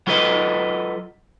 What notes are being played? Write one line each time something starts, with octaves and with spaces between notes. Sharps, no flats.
F#3 F4 A4 B4 D#5